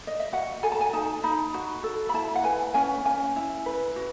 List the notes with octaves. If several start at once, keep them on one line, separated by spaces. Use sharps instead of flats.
D#5
E5
F#4 F#5
A4 G#5
A5
G#5
D#4 A5
D#4 B5
F#4
A4
B5
E4 A5
F#5
B4 G#5
C#4 G#5
C#4 G#5
E4
B4
F#4